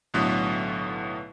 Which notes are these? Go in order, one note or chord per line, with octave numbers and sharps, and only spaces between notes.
B1 A2 D3 F#3 B3 B4